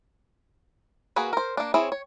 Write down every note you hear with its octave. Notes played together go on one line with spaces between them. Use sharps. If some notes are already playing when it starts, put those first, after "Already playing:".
A#3 F#4 G#4 B4
A#4 C5
A#3 D4
C4 E4 G#4 C#5
C#5